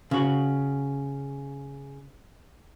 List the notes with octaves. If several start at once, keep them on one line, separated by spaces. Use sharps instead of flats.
C#3 F#4